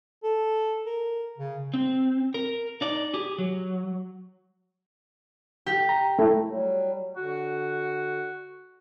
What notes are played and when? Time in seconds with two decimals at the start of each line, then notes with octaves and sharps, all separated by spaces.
0.23 A4
0.86 A#4
1.38 C#3
1.74 C4
2.34 A#4
2.81 D#4 D5
3.13 G4 G#4
3.38 F#3
5.66 G4
5.89 A#5
6.19 A3 E4
6.47 F#3 G3
7.17 D3 F#4